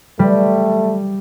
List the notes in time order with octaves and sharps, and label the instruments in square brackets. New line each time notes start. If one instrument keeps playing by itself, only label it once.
[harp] G3 [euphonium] A3